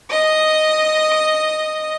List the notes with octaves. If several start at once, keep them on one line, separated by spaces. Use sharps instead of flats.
D#5 D#6